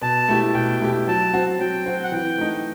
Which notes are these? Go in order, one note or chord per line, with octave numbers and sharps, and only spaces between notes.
B2 A5
A3 E4 G4
B2 G5
A3 E4 G4
F#3 A5
C4 F#4
F#3 G5
C4 F#4
F#5
E3 G5
A3 D#4